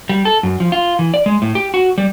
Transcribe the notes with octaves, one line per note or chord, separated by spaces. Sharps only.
G3
A4
F#2
F3
F4
E3
D5
G#3
A2
G4
F#4
G3